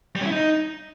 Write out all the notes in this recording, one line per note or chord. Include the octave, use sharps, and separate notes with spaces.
G3
C#4
E4
D#4